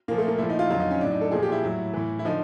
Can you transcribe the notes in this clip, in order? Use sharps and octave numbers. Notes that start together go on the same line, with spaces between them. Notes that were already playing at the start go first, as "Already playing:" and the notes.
A#2 F3 A#3
A3
A#3
A#2 F3 E4
D#4
F4
F2 D3 F#3 F4
D#4
C#4
A2 F#3 D4
D#4
A4
A#2 F3 G#4
G4
E4
A2 F#3
A2 E3
E4
D3 F3 D#4